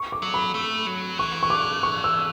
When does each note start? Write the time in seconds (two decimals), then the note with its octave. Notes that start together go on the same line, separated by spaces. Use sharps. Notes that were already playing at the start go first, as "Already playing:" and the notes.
Already playing: C#6
0.12 D6
0.22 F#3
0.34 B5
0.55 A3
0.87 F#3
1.18 E3 C#6
1.43 C#6
1.50 D6
1.83 C#6
2.04 E6